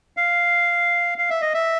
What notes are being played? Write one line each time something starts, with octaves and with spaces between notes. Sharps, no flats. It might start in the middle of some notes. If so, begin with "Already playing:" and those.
F5
F5
E5
D#5
E5